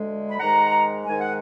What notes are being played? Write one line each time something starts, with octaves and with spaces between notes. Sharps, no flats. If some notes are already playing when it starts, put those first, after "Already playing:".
Already playing: D2 D3 G#3
B5
G#2 D#3 G#3 F#5 A#5
G#2 D#3 G#3 G#5
F#5